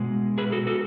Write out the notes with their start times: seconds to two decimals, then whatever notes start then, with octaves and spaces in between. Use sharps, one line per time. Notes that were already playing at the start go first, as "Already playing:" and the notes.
Already playing: B2 G#3
0.38 G#4 B4
0.52 F#4 A4
0.67 F#4 A4